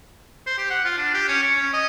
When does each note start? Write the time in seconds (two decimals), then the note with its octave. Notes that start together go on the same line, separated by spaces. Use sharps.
0.47 C5
0.58 G4
0.70 F#5
0.84 F4
0.98 D4
1.14 G4
1.28 C#4
1.43 C#6
1.57 C#4
1.73 D#5